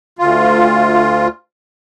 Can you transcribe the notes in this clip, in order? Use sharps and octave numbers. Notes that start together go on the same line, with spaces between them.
D2 F4